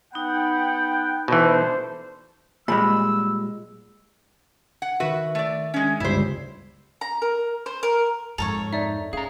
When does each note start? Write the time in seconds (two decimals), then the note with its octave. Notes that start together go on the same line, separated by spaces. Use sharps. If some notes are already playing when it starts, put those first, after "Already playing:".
0.13 B3 D#4 F#5 G5 B5
1.28 B2 E3 D4 A4 C5
2.68 A#2 G3 G#3 B5 E6
4.82 F#5
5.00 D#3 F#4 B4 E5
5.35 A3 D5
5.74 G#3 C#4
6.00 G1 C#2 G3 E4 C5
7.01 A#5
7.22 A#4
7.66 C5
7.83 A#4
8.38 F2 G#2 A4 A#4 C#5 A#5
8.73 D#4 D5 E5
9.13 C#4 G#4 F5 A#5